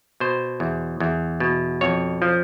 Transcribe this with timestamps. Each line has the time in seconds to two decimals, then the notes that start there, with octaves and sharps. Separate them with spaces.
0.20 B2 C5
0.60 E2
1.00 E2
1.40 B2
1.81 F2 C#5
2.22 F3